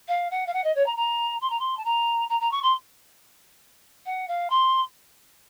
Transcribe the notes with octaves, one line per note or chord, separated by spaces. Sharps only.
F5
F#5
F5
F#5
D#5
C#5
A#5
A#5
C6
A#5
C6
A5
A#5
A#5
A#5
C#6
C6
F#5
F5
C6